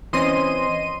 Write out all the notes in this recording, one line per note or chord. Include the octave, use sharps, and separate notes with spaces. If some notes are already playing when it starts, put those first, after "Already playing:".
E3 C4 C#4 D#5 C6 D#7